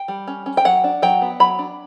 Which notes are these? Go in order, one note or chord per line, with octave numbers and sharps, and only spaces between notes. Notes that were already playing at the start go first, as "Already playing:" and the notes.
Already playing: G5
G3
C#4
C#4
G5
F#3 F#5
D4
F#3 G5
B3
F#3 B5
D4